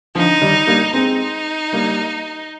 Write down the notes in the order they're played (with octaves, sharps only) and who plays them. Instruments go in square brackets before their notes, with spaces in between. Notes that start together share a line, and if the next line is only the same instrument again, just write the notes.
[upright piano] D3 F3 [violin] D#4
[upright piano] D#3 G3
G3 A#3
[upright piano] G#3 C4 [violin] D#4
[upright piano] G3 A#3